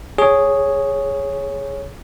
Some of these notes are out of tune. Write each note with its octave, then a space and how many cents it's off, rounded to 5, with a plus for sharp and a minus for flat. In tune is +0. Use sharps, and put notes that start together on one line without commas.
G#4 +0 C#5 +0